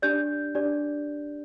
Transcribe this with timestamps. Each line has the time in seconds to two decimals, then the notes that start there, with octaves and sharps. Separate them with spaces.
0.02 D4 G4 D5 G6
0.55 D4 G4 D5